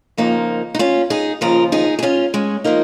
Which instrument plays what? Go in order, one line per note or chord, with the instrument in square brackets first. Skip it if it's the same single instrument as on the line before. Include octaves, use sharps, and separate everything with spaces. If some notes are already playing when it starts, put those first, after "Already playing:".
[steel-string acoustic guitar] F2 C#3 F3 A#3 D#4
D#4
C#4 F4
D#4 G#4
D#2 C#3 F3 F4 A#4
D#4 G#4
G#4
C#4 F4
G#3 C#4
F3 A#3 D#4